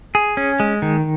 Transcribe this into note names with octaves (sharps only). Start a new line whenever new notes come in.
G#4
C#4
G#3
D#3